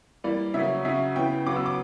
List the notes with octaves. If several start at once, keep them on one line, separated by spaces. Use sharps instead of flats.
E3 G3 A#3 D5
C#3 F#3 A#3 C#4 E5
C#3 F#3 C#4 E5
C#3 E3 B3 G5
C#3 F#3 B3 D6
E6
D6